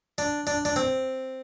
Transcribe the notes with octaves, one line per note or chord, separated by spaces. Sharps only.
D4
D4
D4
C4